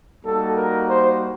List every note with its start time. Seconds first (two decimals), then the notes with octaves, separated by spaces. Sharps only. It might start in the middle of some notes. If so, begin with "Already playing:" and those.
0.24 G3 A#3 D#4 F#4 A4
0.56 A#4
0.88 C5